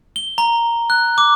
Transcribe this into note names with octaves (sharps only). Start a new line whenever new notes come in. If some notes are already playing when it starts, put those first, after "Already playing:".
G7
A#5
F#6
D6